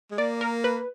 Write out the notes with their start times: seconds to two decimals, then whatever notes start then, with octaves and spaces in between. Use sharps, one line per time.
0.11 G#3
0.18 A#3 D5
0.41 A#4
0.64 B4